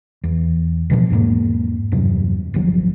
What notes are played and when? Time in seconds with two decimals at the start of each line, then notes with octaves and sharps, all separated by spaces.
0.24 E2
0.90 A1 B2 F3
1.10 E2 G#2 A3 A#3
1.92 E2 G2 C3 F#3
2.54 D1 G1 F3 F#3